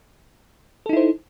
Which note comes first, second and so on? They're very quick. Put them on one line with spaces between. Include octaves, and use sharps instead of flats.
A4 D#4 E4 C5